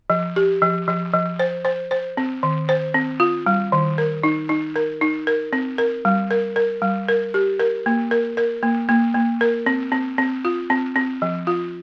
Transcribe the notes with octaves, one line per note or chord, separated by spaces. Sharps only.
F3
G4
F3
F3
F3
C5
C5
C5
C4
D#3
C5
C4
F4
G3
D#3
A#4
D#4
D#4
A#4
D#4
A#4
C4
A#4
G3
A#4
A#4
G3
A#4
G4
A#4
A#3
A#4
A#4
A#3
A#3
A#3
A#4
C4
C4
C4
F4
C4
C4
F3
F4